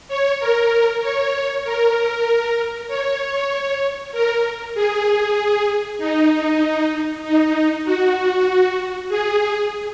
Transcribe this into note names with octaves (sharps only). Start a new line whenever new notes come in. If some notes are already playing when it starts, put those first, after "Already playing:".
C#5
A#4
C#5
A#4
C#5
A#4
G#4
D#4
D#4
F#4
G#4